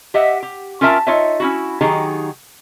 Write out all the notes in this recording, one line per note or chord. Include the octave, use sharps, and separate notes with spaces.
G4 D#5 E5 F#5
G4
C#4 F4 A#4 E5 A5
D#4 F4 C#5 D#5 E5
C#4 E4 F#4
D#3 F#3 D#4 G4 G#4